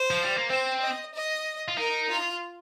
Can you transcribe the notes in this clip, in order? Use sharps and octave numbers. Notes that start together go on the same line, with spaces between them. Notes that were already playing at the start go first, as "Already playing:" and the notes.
Already playing: C5
F3
G3
A#3
C4 C5
D#5
D#5
F4
D#4 A#4
F4